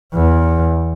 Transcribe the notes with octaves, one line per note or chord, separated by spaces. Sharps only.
E2